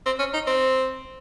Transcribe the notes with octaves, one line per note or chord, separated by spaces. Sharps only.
C4
C#4
D#4
C4